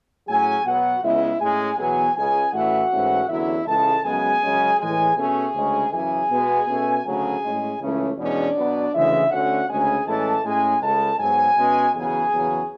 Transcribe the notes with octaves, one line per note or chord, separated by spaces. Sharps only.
A2 F#3 C#4 G#4 G#5
B2 F#3 B3 F#4 F#5
C#2 C#3 G#3 B3 E4 E5
A2 G#3 C#4 G#4 G#5
E2 B2 F#3 B3 G#4 G#5
C#2 C#3 G#3 G#4 G#5
A2 E3 A3 C#4 F#4 F#5
G#2 E3 A3 C#4
E2 D3 F#3 C#4 E4 E5
C#2 C#3 E3 G#3 A4 A5
F#2 C#3 G#3 B3 G#4 G#5
F#2 C#3 G#3 C#4
A2 E3 G#3 G#4 G#5
B2 A3 C#4 G#4 G#5
D2 C#3 G#3 C#4
F#2 C#3 E3 G#4 G#5
B2 G#3 B3
B2 A3 C#4
D2 C#3 F#3 A3 C#4 G#4 G#5
A2 G#3 C#4
C#2 C#3 E3 A3 C#4
E2 B2 G#3 C#4 D4 D5
B2 F#3 B3
D2 C#3 E3 G#3 E4 E5
D2 D3 A3 C#4 F#4 F#5
D2 C#3 G#3 C#4 G#4 G#5
A2 E3 G#3 C#4 A4 A5
A2 G#3 C#4 G#4 G#5
C#2 C#3 G#3 A4 A5
G#2 F#3 B3 G#4 G#5
B2 G#3 C#4
E2 C#3 F#3 B3 G#4 G#5
E2 C#3 F#3 C#4